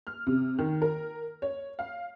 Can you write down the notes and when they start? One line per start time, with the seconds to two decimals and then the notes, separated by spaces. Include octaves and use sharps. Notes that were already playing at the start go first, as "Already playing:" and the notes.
0.07 F6
0.27 C3
0.59 D#3
0.82 A#4
1.42 C#5
1.79 F5